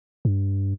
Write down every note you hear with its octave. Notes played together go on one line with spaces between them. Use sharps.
G2